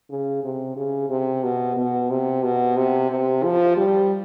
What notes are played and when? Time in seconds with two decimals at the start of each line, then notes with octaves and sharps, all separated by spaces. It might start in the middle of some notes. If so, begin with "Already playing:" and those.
0.10 C#3
0.43 C3
0.76 C#3
1.10 C3
1.43 B2
1.77 B2
2.10 C3
2.43 B2
2.77 C3
3.10 C3
3.44 F3
3.77 G3